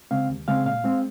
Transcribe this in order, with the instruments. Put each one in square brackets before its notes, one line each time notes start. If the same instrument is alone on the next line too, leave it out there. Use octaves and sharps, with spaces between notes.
[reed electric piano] C#3 G#3 C4 F5
D#2
C#3 G#3 C4 F5
A#2 F5
G#3 C4